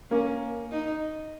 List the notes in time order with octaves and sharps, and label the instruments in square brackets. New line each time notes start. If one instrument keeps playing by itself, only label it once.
[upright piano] A#3 [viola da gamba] C#4
[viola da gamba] D#4